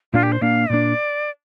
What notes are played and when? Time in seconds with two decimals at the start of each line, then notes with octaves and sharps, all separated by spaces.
0.13 A#2 A#3 D4 F4
0.23 G4
0.32 C5
0.41 A#2 A#3 D4 F5
0.70 A#2 A#3 D4 D5